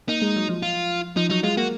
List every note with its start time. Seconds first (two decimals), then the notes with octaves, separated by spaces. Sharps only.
0.08 A#3 D#4
0.22 G#3
0.36 F#3
0.49 F3
0.62 F4
1.17 F3 D#4
1.30 F#3 D#4
1.43 G#3 F4
1.57 A#3 F#4